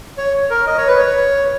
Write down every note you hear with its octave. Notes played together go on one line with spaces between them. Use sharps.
C#5
A#4
D#5
C#5
B4
C#5